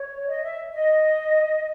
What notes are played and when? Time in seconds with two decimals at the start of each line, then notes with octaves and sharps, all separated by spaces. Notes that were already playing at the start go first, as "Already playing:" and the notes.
Already playing: C#5
0.27 D#5
0.43 E5
0.72 D#5